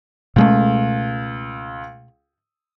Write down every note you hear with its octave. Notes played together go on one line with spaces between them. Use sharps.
C#2 B2 G#3 A3